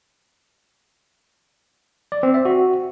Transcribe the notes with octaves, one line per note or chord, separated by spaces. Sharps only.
D5
C4
E5
F#4